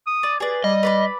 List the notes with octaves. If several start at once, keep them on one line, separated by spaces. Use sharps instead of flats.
D#6
D5
G#4 B4 D5
G3 D#5
B4 D5 B5